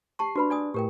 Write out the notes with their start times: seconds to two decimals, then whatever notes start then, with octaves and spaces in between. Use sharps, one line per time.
0.19 G4 A5 C#6 C7
0.36 D4 F#4 B4 B5
0.50 D5 G#5 D#6
0.74 A2 G4 A#4 G5